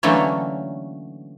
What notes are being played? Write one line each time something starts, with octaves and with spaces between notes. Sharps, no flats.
D3 E3 F#3 A3 A#3 C#4